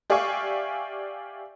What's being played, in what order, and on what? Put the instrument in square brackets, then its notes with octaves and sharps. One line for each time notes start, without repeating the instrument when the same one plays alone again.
[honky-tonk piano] G4 D5 E5 F5 G#5 C#6